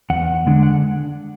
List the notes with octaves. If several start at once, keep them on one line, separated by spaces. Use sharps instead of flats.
E2 F#5
D3 G#3 D4
F#5